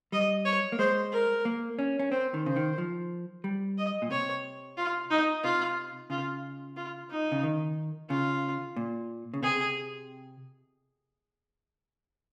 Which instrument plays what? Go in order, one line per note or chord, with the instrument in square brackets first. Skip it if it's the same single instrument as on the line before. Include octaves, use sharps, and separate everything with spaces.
[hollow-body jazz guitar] G3 [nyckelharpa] D#5
[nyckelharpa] C#5
[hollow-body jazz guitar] A#3
[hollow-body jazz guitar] G#3 [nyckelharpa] C5
[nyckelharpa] A#4
[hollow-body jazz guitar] A#3
C#4
C#4
[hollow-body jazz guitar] C4 [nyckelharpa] C5
[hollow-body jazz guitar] D#3
[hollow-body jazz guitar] C#3 [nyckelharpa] C5
[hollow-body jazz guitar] D#3
F3
G3
[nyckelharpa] D#5
[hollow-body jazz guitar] A#2
[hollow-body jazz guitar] C3 [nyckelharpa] C#5
[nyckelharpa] F4
D#4
[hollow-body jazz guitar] C3 [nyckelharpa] F4
[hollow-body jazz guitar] C#3 [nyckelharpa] F4
[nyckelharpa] F4
D#4
[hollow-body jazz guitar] C#3
D#3
[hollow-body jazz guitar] C#3 [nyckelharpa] F4
[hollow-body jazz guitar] A#2
C#3
[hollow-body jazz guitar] C3 [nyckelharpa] G#4